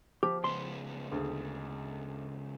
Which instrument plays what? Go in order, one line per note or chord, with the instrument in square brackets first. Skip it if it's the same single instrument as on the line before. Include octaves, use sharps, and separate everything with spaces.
[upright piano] F3 [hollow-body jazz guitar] G4
[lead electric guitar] C#2 B3 [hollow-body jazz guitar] C6
[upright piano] D2 G#4